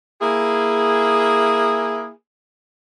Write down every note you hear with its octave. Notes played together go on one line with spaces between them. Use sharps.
A#3 E4 G#4